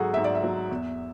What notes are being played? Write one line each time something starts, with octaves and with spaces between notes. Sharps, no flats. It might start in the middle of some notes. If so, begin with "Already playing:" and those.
Already playing: G#2 F#3 F#4 G#4 A4
G#2 E5
D5
E5
F#3
E2